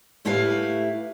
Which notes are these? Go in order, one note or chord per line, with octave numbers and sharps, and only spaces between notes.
A2 A3 E4 G4 B4 F5